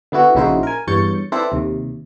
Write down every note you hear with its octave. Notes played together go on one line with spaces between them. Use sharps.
D3 B3 E4 F#4
A#1 C#3 D#4 E4 F#4 C5
A#4 G#5
E2 G2 C#5 G6 A6 C#7
C4 E4 A4 B4 C5 D5
D#2 C3